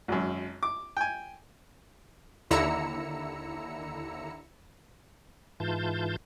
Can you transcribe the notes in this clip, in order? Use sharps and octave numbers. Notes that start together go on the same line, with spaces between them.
G#1 F#2
D6
G5 G#5
D#2 D3 E4 A#5 E6 C#7
G#2 E3 F4 A5 G6